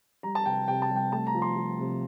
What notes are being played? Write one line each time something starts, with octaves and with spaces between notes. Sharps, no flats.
G3 A#5
A5
C3 G5
C3 G5
A5
G3
G5
A3 A5
A#5
F3
C6
F3
C3